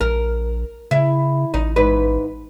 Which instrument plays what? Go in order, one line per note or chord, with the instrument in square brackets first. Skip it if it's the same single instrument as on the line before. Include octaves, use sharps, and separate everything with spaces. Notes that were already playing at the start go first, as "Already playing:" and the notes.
[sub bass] A#1 [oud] A#4
[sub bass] C#3 [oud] E4
[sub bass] A1 [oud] D#4
[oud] G#2 B4